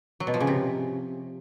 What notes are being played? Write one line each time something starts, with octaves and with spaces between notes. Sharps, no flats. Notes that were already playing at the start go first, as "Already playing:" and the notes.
F#3
B2
F3
C#3
C3